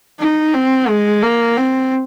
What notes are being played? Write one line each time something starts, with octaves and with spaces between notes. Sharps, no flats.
D#4
C4
G#3
A#3
C4